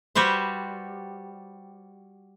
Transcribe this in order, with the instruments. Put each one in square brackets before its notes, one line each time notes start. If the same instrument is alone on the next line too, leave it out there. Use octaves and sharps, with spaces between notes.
[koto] G3 F#4 G4 B4 C5